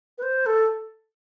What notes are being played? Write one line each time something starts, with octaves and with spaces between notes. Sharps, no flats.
B4
C5
A4